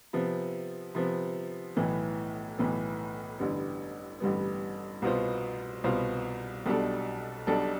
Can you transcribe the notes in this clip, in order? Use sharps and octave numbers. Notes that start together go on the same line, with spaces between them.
C3 F3 B3
C3 F3 B3
B1 A2 E3 B3
B1 A2 E3 B3
A1 G2 D3 G3 B3
A1 G2 D3 G3 B3
C2 B2 B3 F4 C5
C2 B2 B3 F4 C5
B1 B2 G3 D4 A4
B1 B2 G3 D4 A4